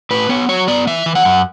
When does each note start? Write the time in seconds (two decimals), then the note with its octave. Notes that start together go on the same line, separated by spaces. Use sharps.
0.11 A2 B4
0.29 B3 C#5
0.49 F#3 C#5
0.68 B3 D5
0.87 E3 E5
1.06 E3
1.15 F#5
1.25 F#2